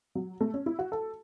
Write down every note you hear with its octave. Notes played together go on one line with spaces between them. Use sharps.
F#3
A3
C#4
E4
F#4
A4